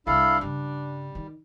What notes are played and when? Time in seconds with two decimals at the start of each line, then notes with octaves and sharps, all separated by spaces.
0.07 C2 D4 E4 A4 F5
0.41 G2 C#3 G3
1.15 D#3